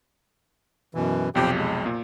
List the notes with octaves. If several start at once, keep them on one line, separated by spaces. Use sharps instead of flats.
F#2 B2 E3
B1 F2 C3 G4 G5
G#3
A#2